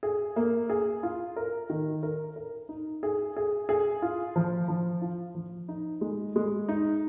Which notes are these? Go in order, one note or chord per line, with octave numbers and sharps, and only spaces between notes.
G#4
A#3
G#4
F4
A#4
D#3
A#4
A#4
D#4
G#4
G#4
G#4
F4
F3
F3
F4
F3
D#4
G#3
G#3
D#4